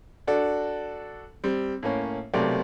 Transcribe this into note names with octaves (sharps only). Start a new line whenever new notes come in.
D4 F#4 A4 D5
G3 C4
A2 A#3 C#4
B1 C3 A3 A#3 D5